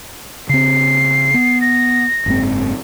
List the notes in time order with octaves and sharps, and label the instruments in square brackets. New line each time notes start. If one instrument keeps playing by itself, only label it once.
[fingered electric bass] C#3 C4 [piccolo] C7
[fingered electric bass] B3
[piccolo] A#6
[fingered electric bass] F#1 G#2 C4